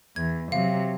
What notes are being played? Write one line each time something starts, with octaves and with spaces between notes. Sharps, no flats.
E2 G#6
C3 F#3 F5